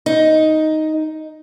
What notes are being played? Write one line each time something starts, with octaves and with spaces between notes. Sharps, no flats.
D#4